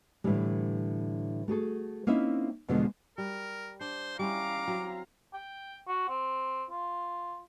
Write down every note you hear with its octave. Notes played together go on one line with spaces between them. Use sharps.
A2 D3 E3 G3 G#3
A3 F#4 G#4 A4
A#3 C4 C#4 D#4 E4 E5
E2 B2 D3 F3 G#3 D4
G3 A#4
D4 C5
G3 C#4 E4 F5 A#5 D6
F#3 C4
G5
F#4
C4
F4